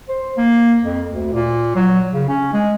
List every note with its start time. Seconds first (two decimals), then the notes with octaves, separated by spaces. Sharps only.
0.09 C5
0.37 A#3
0.84 F2
1.11 D2
1.33 A#2
1.75 F#3
2.13 C#3
2.28 C#4
2.53 G#3